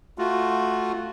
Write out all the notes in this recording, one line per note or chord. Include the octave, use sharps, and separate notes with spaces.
A3 F4 F#4